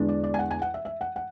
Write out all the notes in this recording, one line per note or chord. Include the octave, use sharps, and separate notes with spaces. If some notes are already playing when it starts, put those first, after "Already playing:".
Already playing: E2 D3 G#3 D4
D5
D5
G#5
F#5
G#5
F#5
E5
E5
F#5
F#5